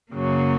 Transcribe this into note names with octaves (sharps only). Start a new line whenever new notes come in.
F#2 C#3 F#3 A#3